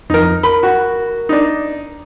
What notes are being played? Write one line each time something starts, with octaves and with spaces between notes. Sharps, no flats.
F2 F3 D#4 A#4
A#4 B5
F#4
D4 D#4